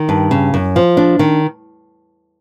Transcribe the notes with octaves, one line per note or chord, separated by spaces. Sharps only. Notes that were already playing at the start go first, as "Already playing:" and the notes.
Already playing: D#3
G2
C#3
F#2
F3
D4
D#3